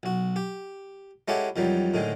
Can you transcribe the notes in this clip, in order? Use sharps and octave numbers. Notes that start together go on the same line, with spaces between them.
B1 F#4
G4
G#3 C#4 E4 G4 A4 F#5
F2 D#3 F#3 G3
A2 D3 D#3 G#3